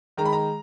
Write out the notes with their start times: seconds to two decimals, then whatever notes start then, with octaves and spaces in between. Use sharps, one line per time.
0.17 D#3 G#3 A#5
0.25 B5
0.33 A#5